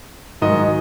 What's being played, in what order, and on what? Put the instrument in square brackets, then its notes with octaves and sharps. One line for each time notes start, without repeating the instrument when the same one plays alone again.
[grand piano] G#2 D#3 F#3 D#5